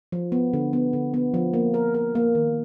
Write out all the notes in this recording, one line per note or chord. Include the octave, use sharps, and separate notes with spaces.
F3
B3
D3
B3
D3
B3
F3
A#3
A#4
A#4
A#3
D#3